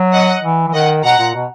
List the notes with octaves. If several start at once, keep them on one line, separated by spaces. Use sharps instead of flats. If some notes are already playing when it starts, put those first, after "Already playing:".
Already playing: F#3
D#5 F#5
E3
E3
D#3 D#5 F#5
B2 F#5 A#5
A#2
B2